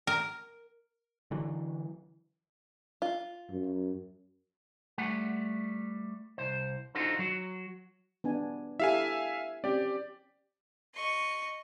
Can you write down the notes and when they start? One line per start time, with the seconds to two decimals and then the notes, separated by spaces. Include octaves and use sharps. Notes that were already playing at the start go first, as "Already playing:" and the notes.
0.07 A#4
1.31 D3 E3 F#3
3.02 F4
3.51 F#2
4.98 G3 A3 F#5
6.38 C2 C5
6.95 D4 D#4 F4 F#4 A4 C5
7.19 F#3 F#4
8.24 B3 D4 G#5
8.80 E4 G4 A4 E5 F5 G#5
9.64 C4 C#4 G4 D5
10.95 D#5 C#6